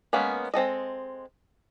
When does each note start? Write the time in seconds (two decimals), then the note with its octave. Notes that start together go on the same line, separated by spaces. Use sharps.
0.13 G#3 A#3 B3 C#4
0.54 G#3 C4 A4 D#5